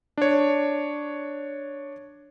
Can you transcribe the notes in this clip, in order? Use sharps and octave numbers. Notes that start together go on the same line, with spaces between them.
D4 C#5